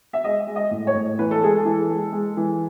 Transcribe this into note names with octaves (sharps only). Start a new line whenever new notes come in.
E5
G#3 D#5
G#3
D#5
A2
C#5
A2
E3 B4
A4
G#3 G#4
A4
E3
G#3
G#3
E3